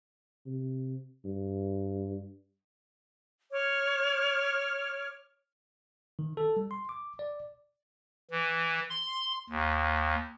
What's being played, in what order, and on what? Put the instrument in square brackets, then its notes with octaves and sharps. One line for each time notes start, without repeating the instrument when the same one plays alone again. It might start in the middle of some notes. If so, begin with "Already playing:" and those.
[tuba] C3
G2
[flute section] C#5 D6 F6
[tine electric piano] D#3
A4
G3
C6
D6
D5
[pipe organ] E3
C6
D#2